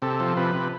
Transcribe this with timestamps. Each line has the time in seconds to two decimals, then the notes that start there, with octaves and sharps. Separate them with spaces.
0.02 C3 A4
0.20 F3
0.37 C3 B4
0.55 C3